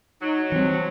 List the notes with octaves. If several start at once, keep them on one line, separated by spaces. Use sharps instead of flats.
F#3 D#4
E3 G3 C4